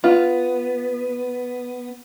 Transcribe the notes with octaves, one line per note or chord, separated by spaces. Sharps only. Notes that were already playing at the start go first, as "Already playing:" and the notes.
B3 F4